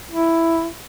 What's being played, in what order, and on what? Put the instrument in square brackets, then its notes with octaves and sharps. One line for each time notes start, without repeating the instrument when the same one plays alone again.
[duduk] E4